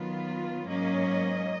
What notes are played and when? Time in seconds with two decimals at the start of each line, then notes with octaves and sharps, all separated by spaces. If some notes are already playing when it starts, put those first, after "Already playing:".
Already playing: D#3 F#3 B3 F4
0.67 G#2 F#3 A#3 C#4 D#5